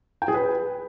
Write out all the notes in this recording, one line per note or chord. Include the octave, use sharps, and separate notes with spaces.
G5
G#4
B4